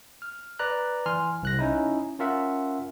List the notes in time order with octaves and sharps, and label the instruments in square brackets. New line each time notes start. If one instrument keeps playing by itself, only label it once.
[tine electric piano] F6
B4 D5 A#5 F#6
E3 G#5 C6 F6
C2 F#6 A#6
C#4 D#4 E4
C#4 F4 A#4 E5 F#5